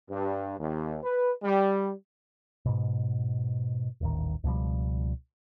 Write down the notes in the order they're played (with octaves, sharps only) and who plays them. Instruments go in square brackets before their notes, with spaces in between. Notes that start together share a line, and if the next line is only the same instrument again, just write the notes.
[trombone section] G2
D#2
B4
G3
[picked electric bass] G#2 B2
D#1 A1 D#3
C#2 B2 F3 G3